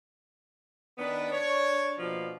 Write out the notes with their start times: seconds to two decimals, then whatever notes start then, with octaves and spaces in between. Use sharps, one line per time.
0.98 D#3 B3 D4 B4
1.32 C#5
1.98 B2 F3 A#3